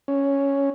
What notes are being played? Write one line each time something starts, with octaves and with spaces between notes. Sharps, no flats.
C#4